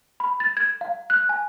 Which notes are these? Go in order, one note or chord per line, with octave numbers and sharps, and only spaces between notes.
B5
A6
G#6
F5
F#6
G#5